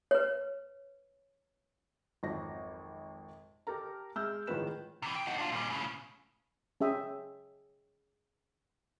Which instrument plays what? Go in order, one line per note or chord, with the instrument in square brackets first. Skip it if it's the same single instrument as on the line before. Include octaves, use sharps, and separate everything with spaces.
[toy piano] B4 C#5
[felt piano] G#1 F2 F#3 A#6
G4 A4 A#4 A#5
G#3 E5 E6 F6 G6
A1 D#3 F3 G#3 B4 E7
[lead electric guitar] C3 E3
G5
D#4 F#4
D4 F4
A#2 G3
A2 C#3
[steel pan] C#4 G#4 E5 G5 D#6